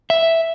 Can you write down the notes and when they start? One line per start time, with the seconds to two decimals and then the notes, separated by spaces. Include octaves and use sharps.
0.10 E5